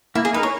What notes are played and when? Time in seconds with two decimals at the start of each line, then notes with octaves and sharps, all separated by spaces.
0.15 A#3 E4
0.25 G#4
0.33 D#4 A#4 B4
0.43 C#5